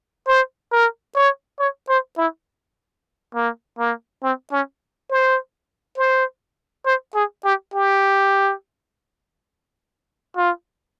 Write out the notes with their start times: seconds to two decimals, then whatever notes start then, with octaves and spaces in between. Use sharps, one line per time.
0.28 C5
0.72 A#4
1.15 C#5
1.59 C#5
1.89 C5
2.18 E4
3.35 A#3
3.79 A#3
4.23 C4
4.52 C#4
5.11 C5
5.98 C5
6.86 C5
7.15 G#4
7.45 G4
7.74 G4
10.37 F4